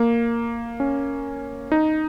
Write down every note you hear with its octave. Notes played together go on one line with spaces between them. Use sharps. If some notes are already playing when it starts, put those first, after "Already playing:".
Already playing: A#3
C#4
D#4